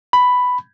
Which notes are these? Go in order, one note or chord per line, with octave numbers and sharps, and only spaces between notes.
B5